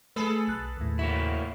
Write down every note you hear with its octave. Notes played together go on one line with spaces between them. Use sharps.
A3 G#4 A4 B4
B1 F#6 A6
D#2 A2
A#3 E4 F#4